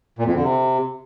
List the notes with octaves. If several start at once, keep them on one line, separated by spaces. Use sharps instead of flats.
A#2
F2
D3
C3